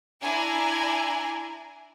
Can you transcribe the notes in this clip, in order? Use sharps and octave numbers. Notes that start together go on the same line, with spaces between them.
D4 E4 G#5 A#5